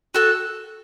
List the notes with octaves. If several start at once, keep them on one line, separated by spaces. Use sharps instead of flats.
F#4 A4